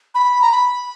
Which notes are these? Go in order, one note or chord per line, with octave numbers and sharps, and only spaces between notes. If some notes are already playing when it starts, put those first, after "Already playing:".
B5
A#5
B5